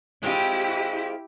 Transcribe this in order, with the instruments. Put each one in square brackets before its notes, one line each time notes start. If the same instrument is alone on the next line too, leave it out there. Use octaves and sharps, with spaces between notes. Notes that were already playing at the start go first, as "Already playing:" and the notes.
[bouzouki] G#3 C4 F4 [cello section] E4 G4